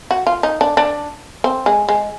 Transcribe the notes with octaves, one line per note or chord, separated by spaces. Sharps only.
F#4
F4
D#4
D4
D4
C4
G#3
G#3